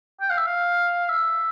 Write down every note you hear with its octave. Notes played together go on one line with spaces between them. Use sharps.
G5
F5
E5
F5
E5